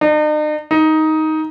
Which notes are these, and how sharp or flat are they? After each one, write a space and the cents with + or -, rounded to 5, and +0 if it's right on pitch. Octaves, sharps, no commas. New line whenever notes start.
D#4 -45
D#4 +10